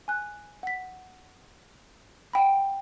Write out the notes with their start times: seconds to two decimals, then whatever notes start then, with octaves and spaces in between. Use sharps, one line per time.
0.08 G#5 F#6
0.63 F#5 B6
2.33 F#5 G5 B5